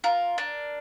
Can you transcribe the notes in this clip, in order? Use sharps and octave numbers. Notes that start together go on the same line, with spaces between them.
F4 A#4
D4